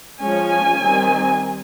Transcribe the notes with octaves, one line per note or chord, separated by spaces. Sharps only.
F3 G#3 C#4 G#5
D#3 G3 C4